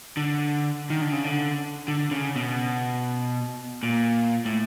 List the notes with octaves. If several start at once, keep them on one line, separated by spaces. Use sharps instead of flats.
D3
D#3
D3
C#3
D3
D3
C#3
B2
A#2
A2